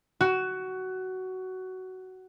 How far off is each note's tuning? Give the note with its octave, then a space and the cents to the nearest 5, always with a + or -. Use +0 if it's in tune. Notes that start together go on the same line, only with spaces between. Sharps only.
F#4 +15